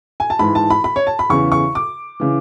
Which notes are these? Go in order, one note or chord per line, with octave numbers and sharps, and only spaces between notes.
G#5
A5
G#2 E3 B5
A5
B5
B5
C#5
A5
B5
E2 C#3 E3 C#6
C#6
D6
C#3 E3